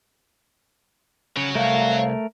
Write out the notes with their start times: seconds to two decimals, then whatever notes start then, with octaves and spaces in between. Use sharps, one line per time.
1.37 C#3 F#4 C#5
1.55 C2 A3 A#4 F5